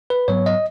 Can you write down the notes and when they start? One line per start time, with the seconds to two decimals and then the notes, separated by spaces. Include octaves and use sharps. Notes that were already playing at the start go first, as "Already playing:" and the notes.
0.10 B4
0.28 G#2 F#3 B3 C#5
0.46 D#5